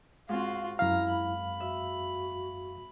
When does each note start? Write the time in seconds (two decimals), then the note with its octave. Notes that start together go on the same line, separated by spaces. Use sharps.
0.29 G#2 C4 F4 F#4 F5
0.79 F#2 E4 F5 A#5
1.10 B5
1.60 F#4 E5